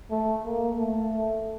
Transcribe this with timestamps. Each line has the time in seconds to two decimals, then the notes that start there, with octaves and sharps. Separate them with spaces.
0.10 A3
0.45 A#3
0.79 A3